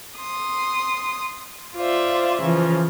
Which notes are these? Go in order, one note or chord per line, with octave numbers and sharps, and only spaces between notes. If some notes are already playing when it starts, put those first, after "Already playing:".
C6 D#6
F4 C5 D5 E5
C#3 E3 F3